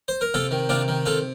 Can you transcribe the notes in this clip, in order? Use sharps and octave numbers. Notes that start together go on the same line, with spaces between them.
C5
A#4
C3 F4 A4
D#3
C3 D4 F4
D#3
C3 F4 A4